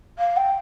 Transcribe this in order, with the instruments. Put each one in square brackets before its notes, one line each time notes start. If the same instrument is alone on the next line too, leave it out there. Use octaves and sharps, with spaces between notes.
[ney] F5
G5